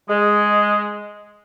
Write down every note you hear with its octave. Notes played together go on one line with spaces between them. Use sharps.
G#3